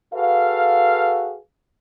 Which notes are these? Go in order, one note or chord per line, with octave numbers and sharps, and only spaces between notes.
F#4 G#4 A4 B4 F5